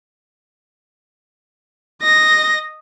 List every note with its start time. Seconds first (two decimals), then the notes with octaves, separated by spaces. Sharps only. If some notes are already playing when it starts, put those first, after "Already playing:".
2.03 D#5 A#6